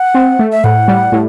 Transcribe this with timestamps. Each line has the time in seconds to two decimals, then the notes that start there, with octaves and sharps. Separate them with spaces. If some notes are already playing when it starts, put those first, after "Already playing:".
Already playing: F#5
0.15 C4
0.39 A3
0.52 E5
0.64 A2 F#5
0.88 G3
1.12 A2